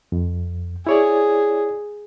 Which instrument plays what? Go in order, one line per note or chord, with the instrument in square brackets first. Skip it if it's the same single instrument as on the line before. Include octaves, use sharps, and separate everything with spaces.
[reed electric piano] F2
[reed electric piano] E4 C#5 D5 [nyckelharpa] G#4